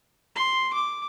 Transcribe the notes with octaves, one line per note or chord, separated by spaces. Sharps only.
C6
D6